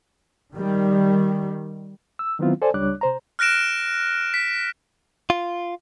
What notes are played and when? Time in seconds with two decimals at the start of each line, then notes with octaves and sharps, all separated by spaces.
0.54 D#3 G3
2.19 E6
2.39 D#3 F#3 B3 C4 E4 F4
2.62 A4 C5 D5 G#5 A5
2.74 C#2 G3 D4 C#5 D6 F#6
3.01 C3 C5 A#5
3.39 F6 F#6 A#6 D7 E7
4.34 B6
5.30 F4